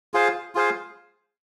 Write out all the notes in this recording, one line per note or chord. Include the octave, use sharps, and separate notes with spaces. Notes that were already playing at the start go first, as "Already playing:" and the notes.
F4 G#4 C5 F5
F4 G#4 C5 F5